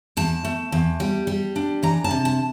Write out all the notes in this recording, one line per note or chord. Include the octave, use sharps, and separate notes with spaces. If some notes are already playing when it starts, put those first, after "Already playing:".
E2 A5
A3
E2
G3
G3
D4
E3 A#5
A5
C3
A5